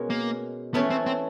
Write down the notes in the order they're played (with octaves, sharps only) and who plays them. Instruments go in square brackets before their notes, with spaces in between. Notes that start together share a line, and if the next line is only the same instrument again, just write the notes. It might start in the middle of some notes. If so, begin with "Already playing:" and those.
Already playing: [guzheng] B2 G#3 C#4 A#4
[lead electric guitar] A#3
[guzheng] E3 A3 C#4 E4 [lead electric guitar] B3
[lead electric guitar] C4
C4